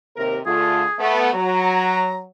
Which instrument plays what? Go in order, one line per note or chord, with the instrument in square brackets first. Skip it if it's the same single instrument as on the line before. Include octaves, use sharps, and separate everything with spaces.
[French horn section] D#2 C3 A#4
[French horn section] D3 A3 F4 [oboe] G#4
[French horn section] A3 B3
[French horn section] F#3 [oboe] A#5